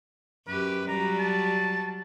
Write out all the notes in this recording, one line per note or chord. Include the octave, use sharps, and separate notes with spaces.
F#2 G4 B4
F#3 G3 A#5
A5